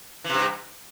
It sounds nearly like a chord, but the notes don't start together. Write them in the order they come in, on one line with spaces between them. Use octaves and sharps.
E3 C3 G2